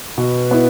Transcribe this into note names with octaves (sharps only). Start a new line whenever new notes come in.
B2 B4
B3 E4